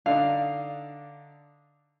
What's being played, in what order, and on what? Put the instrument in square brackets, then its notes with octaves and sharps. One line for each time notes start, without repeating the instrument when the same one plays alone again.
[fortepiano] D3 D4 D#4 [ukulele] F5